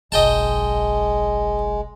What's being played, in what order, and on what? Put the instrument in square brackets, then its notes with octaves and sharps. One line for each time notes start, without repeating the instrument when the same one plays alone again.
[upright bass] F#1 B1 [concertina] G#3 [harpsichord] D#5 G5 A5